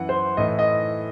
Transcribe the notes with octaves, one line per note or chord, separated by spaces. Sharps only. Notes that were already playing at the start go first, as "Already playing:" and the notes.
Already playing: F#2 E3 F#5
C5
A2 E3 D#5
D#5